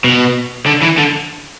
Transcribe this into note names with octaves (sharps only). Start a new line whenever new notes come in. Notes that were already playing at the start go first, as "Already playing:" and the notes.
B2
D3
E3
D3